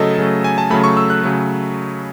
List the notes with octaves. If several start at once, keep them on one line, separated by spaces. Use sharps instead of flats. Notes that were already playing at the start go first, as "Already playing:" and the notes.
Already playing: C#3 F#3 A3 A4 D#5
C#3 F#3 A3
G#5
A5
C#3 F#3 A3 B5
C#6
E6
F#6
C#3 F#3 A3